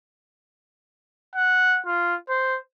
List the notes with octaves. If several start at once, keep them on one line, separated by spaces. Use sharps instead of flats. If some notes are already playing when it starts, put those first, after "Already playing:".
F#5
F4
C5